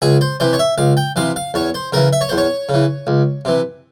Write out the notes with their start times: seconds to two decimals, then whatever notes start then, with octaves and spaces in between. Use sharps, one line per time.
0.02 C#2 G#4
0.21 C5
0.40 C3 E3 C5
0.53 C#5
0.59 E5
0.78 C#2 F5
0.97 G5
1.16 C3 E3 F5
1.36 F5
1.54 E2 C#5
1.74 C5
1.92 C#3 E3 A#4
2.13 E5
2.21 C#5
2.29 E2 C5
2.38 C#5
2.69 C#3
2.74 E3
3.07 C#2
3.45 C3 E3